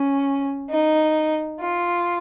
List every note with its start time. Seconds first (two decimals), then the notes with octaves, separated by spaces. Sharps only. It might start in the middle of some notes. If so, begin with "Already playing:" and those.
Already playing: C#4
0.70 D#4
1.59 F4